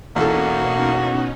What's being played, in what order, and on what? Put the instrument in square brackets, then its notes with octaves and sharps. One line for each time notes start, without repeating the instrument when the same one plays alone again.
[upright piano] E2 A4 [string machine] B2 C#4 D#4 [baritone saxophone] A#3 [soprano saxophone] F#4